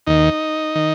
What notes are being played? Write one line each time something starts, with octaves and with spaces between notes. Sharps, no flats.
D#2 D#3 D#4
D#3